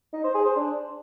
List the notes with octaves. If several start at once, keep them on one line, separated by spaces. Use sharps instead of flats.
D#4
C5
G#4
C5
D4